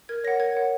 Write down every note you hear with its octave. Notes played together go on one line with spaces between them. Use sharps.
A#4 G#6
C#5 F#5 A#6
A#4 G#6
C#5 F#5